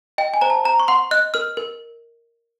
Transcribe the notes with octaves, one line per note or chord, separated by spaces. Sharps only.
D#5 G5
G#5
C5 A#5
A5
C5 A#5
C#6
F#5 C6
D#5 F#6
A#4 F6
A#4